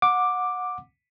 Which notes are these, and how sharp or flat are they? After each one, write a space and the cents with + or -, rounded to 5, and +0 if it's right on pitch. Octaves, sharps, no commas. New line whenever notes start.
F#5 -20 D6 +5